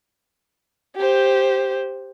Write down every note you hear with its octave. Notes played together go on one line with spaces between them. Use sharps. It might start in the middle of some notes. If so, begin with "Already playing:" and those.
G4 C5